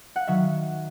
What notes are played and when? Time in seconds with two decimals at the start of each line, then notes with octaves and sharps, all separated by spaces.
0.16 F#5
0.27 D#3 F#3 E5